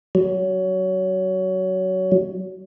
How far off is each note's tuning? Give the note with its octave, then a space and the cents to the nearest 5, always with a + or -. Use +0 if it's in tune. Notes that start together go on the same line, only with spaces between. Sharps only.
F#3 +20